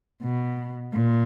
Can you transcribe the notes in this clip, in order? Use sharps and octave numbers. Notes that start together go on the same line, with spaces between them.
B2
A#2